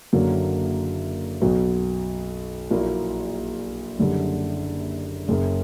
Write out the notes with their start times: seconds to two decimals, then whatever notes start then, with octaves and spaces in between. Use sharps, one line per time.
0.13 F#1 F#2 D3 F#3 A#3
1.41 B1 B2 F#3
2.71 A#1 A#2 F#3 A#3 E4
3.99 F#1 F#2 D3 G3
5.27 F#1 F#2 C#3